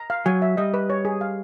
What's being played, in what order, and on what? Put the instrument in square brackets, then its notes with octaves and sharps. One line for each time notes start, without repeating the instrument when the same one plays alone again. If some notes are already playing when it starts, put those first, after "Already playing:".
Already playing: [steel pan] A#5
F5
[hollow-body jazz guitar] F#3 [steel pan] G#5
[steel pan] E5
[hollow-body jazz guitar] G3 [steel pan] D#5
[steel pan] B4
C#5
G#4
F5